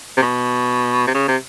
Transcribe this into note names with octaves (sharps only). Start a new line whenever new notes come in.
C3
B2
C3
C#3
C3